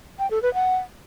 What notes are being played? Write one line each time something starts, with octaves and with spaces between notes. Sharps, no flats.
G5
A4
B4
F#5